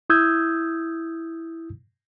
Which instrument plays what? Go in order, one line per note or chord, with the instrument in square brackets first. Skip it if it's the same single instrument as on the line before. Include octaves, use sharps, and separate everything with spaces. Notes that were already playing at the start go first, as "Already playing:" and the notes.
[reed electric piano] E4 D#6 E6 G6 G#6